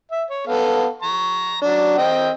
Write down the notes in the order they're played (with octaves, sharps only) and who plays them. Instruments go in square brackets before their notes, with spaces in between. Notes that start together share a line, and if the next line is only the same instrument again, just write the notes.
[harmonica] E5
C#5
B3 A4 F5
A#5 C#6
F#3 D4
C4 D#5 G5